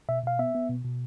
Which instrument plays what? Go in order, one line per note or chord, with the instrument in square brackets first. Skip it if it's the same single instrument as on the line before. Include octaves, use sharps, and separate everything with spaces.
[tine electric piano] B2 E5
B2 F5
B3 E5
B3
B2
B2